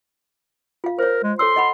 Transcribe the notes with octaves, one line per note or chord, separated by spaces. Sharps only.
F4 F5
A#4 C5 C#5
G#3
A4 C#5 C6 E6
D#5 F#5 B5